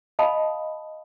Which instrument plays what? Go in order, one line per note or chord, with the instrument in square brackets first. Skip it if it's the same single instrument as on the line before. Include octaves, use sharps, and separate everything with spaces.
[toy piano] D#5 F5 A5 B5 C6 D#6